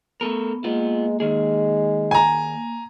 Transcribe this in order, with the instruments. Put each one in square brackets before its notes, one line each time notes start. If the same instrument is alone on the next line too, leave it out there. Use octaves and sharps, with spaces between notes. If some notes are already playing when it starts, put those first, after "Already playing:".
[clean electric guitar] A3 A4 A#4 [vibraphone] B3
[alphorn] G#3 [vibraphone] A#3 [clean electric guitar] B3 F4
[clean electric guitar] D#2 D#3 G#4 [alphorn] G#3
[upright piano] G#5 A#5